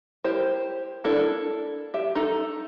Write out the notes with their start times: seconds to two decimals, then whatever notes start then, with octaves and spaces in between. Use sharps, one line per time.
0.24 E4 G4 A#4 C5
1.04 D4 E4 A4 A#4
1.94 G4 E5
2.15 D#4 A4